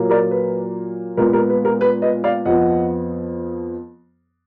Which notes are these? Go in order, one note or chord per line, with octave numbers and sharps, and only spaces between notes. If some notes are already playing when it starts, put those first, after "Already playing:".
Already playing: A#2 F#3 A#3
A#4 D5
B4
A#2 G#3 B3 A#4
A#4
B4
A#4
B4
B4 D#5
D5 F5
F2 F3 B3 D#5 F#5